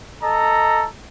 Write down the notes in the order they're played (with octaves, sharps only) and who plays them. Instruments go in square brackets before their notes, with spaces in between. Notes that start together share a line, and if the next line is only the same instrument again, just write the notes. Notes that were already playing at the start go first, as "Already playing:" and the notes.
[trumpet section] A4 D#5 A#5